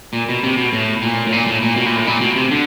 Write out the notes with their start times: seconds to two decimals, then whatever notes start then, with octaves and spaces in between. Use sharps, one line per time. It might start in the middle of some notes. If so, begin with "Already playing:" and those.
0.13 A#2
0.29 B2
0.43 C3
0.57 B2
0.73 A2
1.02 A#2
1.27 A2
1.32 A#2
1.47 A2
1.62 A#2
1.76 B2
1.86 A#2
1.97 A2
2.07 A#2
2.21 B2
2.36 C3
2.51 D3